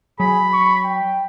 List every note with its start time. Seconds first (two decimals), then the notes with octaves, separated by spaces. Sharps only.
0.20 F#3 G#4 B5
0.53 C#6
0.85 G5